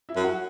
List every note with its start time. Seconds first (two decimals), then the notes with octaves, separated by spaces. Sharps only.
0.09 E4 E5
0.17 F#2
0.24 F#4 F#5